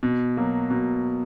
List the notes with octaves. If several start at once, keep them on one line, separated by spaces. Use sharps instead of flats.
B2
F#3 A#3
B2